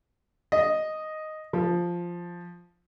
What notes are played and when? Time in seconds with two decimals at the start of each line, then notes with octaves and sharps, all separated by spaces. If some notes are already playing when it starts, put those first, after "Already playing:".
0.52 D#5
1.53 F3